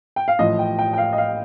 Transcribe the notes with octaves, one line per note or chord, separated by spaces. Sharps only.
G5
F5
A1 A2 F3 D#5
G5
G5
G5
F5
D#5
F5